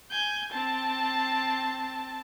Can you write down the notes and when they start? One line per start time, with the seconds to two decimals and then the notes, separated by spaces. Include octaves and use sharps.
0.10 G#5 G6
0.52 C4 A5